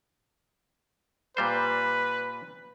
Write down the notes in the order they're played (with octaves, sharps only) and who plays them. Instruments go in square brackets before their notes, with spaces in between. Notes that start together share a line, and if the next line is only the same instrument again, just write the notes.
[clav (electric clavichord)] A#2 G3 C5 [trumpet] B4